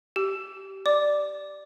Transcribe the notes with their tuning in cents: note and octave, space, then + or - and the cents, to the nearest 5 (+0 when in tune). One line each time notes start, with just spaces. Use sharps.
G4 -20 E6 +20
D5 +0 D6 +0